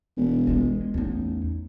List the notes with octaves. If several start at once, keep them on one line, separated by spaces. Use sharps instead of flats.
E1
G#3 F4
A1 E2 D#4